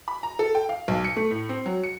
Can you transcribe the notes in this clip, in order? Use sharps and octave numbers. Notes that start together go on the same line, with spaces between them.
B5
A#5
A4
G5
F5
B1
C#7
A3
A2
C4
F#3
C#7